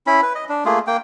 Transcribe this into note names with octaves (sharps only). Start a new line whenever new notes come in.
C#4 E4 B5
B4
D#5
D4
A3 A#3 F4 G#4
A#3 G5